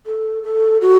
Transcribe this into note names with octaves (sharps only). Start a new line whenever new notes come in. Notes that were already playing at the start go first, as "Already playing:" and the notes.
A4
A4
F#4